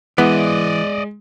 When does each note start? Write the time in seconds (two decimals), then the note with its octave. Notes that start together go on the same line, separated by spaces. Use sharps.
0.18 E3 G#3 B3 D5 D#5